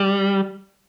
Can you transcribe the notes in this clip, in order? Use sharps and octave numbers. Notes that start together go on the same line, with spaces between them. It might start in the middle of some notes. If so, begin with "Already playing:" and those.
Already playing: G3